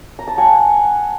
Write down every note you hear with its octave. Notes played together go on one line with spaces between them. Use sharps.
A#5
A5
F#5 G#5